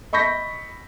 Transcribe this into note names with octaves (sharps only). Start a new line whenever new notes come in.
D#5 B5 C#6 G6 A#6 B6